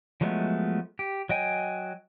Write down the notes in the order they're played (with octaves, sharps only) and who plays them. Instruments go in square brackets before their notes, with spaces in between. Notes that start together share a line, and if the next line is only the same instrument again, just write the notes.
[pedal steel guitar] F3 F#3 G#3 A3 B3
G4
F#3 D#5 G5 G#5